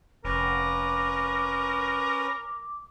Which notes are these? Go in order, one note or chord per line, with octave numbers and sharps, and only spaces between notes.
F1 C#4 A#4 B4 D6